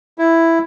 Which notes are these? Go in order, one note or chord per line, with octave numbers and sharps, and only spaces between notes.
E4